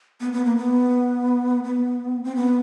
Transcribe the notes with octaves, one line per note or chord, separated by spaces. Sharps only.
B3
B3
A#3
B3
B3
C4
B3